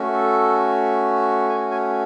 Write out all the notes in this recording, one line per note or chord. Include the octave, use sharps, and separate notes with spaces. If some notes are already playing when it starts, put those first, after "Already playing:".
Already playing: A3 C#4 F#4
A4
G#5
G#5